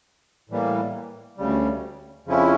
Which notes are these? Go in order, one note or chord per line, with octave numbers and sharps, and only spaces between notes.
A2 E3 G3 A#3
D2 C#3 G3
F2 C#3 F3 C#4 E4